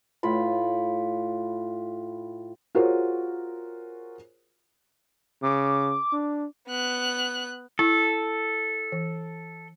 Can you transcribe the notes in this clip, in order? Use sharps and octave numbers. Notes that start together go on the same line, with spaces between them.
A2 F4 B5
F4 F#4 G#4 A#4 C5 C#5
C#3 D6
D4
B3 F#6
E4 A4
E3